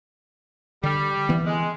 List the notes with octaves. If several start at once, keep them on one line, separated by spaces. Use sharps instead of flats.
D3 G3
E3 B3
G#3